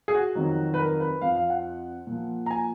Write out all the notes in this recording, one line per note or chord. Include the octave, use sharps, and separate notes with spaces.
G#4
F#4
F2 D#3 F#3
B4
A#4
B4
F2 F3 F5
F5
F#5
A#2
F3
A#5
G#5